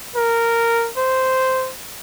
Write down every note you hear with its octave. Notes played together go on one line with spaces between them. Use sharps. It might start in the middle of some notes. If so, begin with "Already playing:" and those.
A#4
C5